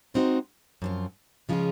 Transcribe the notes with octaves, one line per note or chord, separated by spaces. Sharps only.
G#3 C4 D#4 F#4 C5
F#2 F3 C4
C#3 F3 G#3 C#4 F4